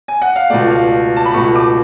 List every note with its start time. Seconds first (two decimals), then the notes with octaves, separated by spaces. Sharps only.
0.08 G#5
0.22 F#5
0.36 F5
0.50 C#2 B2 A3 D5
0.70 F5
1.16 A5
1.25 B5
1.34 C#2 B2 A3 C#6
1.56 D6